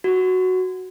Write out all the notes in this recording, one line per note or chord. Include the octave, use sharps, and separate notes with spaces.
F#4